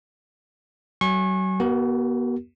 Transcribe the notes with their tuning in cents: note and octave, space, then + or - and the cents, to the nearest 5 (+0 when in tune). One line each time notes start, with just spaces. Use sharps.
F#3 +35 G#5 +0 C#6 -30
B3 -35 F#4 +40 A#4 +0